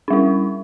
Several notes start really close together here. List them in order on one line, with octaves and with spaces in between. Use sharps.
D4 G3 E4